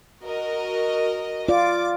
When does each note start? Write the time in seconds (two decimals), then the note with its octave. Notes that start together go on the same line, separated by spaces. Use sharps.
0.22 F#4 A#4 D#5
1.49 F4 D5 D6